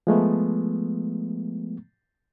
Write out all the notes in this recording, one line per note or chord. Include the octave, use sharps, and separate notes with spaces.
F3 G#3 A3 B3